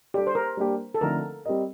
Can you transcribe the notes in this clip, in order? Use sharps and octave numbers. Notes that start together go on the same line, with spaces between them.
G3 D4 G4 A4 D5
C5
A#4
G3 A#3 D4 G4
A4
D3 F3 A3 C4 D#4 A#4
G3 C4 G4 A#4 D#5